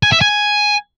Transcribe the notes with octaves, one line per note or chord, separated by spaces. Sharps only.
G#5
E5
G#5